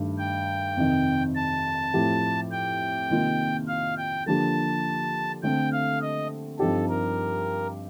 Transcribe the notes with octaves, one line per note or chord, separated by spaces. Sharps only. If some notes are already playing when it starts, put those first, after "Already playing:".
Already playing: G2 D#3 A3 D4
G5
F2 C3 D#3
A5
A2 F3 C4 G4
G5
C3 D#3 A#3 F4
F5
G5
D3 F3 A#3 D4 G4 A5
D3 A3 C4 G5
F5
D#5
G2 F3 C4 D#4 G4 A4
A#4